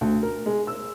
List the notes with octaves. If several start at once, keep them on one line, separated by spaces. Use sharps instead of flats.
D2
A#4
G#3
E6